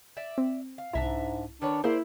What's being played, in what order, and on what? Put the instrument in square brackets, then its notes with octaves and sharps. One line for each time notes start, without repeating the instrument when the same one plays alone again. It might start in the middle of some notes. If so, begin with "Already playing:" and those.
[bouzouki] D5 E5
[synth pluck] C4
[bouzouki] F5
[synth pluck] C2 E4 [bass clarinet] G#2 [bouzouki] D4 E5 A#5
[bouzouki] D#3 B4 C#5 [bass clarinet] D4
[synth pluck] A#3 G#4 [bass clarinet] E4 [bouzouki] C5 D5